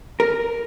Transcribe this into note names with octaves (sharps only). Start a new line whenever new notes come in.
A#4